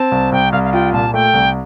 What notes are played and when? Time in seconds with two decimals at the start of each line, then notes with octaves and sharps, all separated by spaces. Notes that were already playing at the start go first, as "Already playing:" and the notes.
Already playing: C4 A5
0.12 C2
0.32 C2 G5
0.52 C2 F5
0.63 F5
0.73 F4 G5
0.92 A#2 A5
1.14 A3 G5
1.34 C2